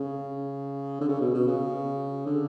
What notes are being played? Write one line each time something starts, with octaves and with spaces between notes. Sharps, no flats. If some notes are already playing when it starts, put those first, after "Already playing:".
Already playing: C#3
D3
C#3
B2
B2
C#3
D3